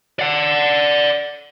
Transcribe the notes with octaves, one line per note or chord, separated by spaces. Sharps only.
D5 F#5